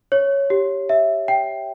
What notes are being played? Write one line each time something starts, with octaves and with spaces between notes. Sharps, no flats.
C#5
G4
E5
G5